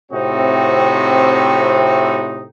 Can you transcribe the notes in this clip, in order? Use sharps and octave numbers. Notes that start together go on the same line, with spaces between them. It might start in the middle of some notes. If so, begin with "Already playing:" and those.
A2 C3 C4 D#4 F#4